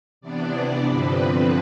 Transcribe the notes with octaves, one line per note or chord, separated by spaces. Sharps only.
C3 E3 B3 D4 D5
D5
G2 D3 F3 C4 B4